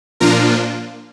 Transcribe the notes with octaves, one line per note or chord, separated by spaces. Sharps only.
A#2 F3 A#3 D4 F4 A#4 A#5